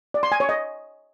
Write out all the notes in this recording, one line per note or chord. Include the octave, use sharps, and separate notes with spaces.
D5
C6
G#5
C#5
D#5